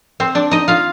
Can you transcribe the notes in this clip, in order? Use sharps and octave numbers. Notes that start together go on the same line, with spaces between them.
C4 C5
D4 D5
D#4 D#5
F4 F5